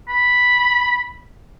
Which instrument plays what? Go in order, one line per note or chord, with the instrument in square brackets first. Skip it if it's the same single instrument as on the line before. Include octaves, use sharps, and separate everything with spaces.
[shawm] B5